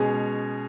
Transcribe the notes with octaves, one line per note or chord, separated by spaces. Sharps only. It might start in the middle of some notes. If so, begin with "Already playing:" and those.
Already playing: B2 G#3 C#4 G#4